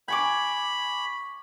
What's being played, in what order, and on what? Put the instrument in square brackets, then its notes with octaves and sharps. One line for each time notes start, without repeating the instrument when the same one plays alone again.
[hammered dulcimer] G#5 C#6 D6 [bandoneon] B5